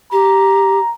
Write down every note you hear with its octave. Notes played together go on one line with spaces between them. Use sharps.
G4 A#5